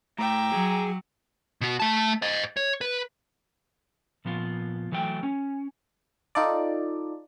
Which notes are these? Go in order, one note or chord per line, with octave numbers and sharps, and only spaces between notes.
A2 E5 G5 A#5 D6
F#3 G#4
B2 F#4
A3 A5
C5 D#5
C#5
B4
A#2 F3 B3 F4
E3 F#3 A3 G5
C#4
D#4 F4 A4 D5